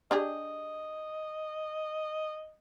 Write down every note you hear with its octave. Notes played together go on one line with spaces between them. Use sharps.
D4 G4 G#4 D#5